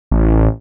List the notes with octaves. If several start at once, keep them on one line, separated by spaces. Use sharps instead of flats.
A1